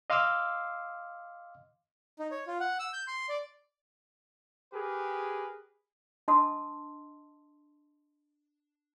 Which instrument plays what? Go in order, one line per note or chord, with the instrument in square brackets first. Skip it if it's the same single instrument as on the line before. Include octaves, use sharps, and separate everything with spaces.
[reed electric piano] D#5 F5 C6 D6 E6 F6
[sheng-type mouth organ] D#4
C#5
F4
F#5
E6
G6
C6
D5
[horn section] G4 G#4 A#4 B4
[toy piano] D4 D#5 A5 C6 D#6 E6